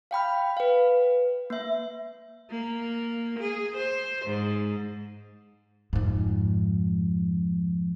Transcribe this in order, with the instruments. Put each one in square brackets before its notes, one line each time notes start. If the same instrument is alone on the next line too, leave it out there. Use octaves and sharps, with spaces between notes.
[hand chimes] F5 G5 B5 F6
B4 F5
A#3 E5
[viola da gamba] A#3
G#4
C5
G#2
[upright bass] F2 G#2